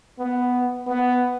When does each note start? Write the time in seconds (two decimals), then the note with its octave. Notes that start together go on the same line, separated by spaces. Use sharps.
0.19 B3
0.87 B3